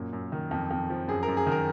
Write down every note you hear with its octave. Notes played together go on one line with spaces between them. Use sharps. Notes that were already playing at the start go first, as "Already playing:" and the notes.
Already playing: F#2 A#2
F#2
D#3
F2
F2
F3
F#2 G#4
A#4
F#2
G#4
D#3 A#4